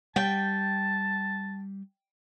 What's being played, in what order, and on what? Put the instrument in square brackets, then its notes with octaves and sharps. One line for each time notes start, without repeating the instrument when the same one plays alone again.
[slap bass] G3 [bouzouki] G5 [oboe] A5